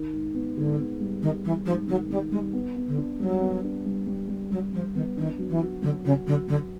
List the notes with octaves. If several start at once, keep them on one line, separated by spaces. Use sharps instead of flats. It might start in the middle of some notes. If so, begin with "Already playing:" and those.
Already playing: D#3
G#2
B3
G#2 D3
B3
G3
D#3 G3
E3 G3
G#2 F3
D#3 F#3
D#3 G3
G3 G#3
B3
B3
D3
D4
F#3 G3
B3
D4
G3
G3
G3
F#3 G3
F3 G3
D#3 B3
D#3 D4
F#3
E3
F#4
D3 F#3
C#3 F#4
D3 F#3
D3 F#3